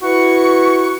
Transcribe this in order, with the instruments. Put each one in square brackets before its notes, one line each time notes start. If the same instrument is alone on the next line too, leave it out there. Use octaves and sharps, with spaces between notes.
[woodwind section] E4 F#4 B4 F#5 C#6